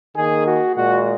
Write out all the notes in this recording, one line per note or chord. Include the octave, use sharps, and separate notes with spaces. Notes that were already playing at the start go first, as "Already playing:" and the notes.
D#3 A#3 G#4
F#4
A#2 G#3 F#4